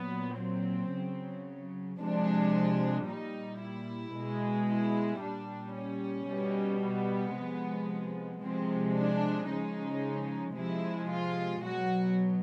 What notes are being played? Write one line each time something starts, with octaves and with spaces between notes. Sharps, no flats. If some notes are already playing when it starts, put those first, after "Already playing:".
Already playing: A#2 F#3 B3
C4
C#3 F#3
C3 F3 G#3 D4
A#2 G3 D#4
E4
B2 G#3
E4
A#2 G3 D4
C#4
B2 G3
B3
C3 F3 G#3
C3 F3 G#3 C4
D4
C#3 F3 G#3 D#4
C3 F3 G#3 E4
F4
B2 F#3 F#4